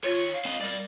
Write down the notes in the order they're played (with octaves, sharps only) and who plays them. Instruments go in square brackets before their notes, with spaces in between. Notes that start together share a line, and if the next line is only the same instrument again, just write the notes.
[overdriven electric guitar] D#3 C#5 [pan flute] F4
[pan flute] F5
[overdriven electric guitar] C4 D#5
[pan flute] G3 [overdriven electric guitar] A#4 D5